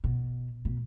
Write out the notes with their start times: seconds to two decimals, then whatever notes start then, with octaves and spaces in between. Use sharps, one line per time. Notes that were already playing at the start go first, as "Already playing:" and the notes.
0.04 B2
0.65 B2